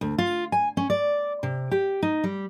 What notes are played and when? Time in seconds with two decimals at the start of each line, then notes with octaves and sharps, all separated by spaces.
0.01 D2
0.18 F4
0.52 G#5
0.77 C#4
0.90 D5
1.43 C3
1.71 G4
2.03 D#4
2.24 G3